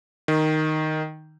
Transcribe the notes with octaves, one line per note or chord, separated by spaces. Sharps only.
D#3